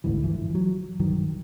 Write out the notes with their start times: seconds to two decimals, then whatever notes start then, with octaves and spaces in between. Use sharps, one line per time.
0.04 A1 D2 G#2 E3
0.23 G1 E3 F3
0.55 F#3
0.99 B1 G2 D#3 F#3